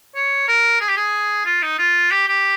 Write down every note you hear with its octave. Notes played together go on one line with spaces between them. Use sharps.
C#5
A#4
G#4
G4
G#4
F4
D#4
F4
G4
G4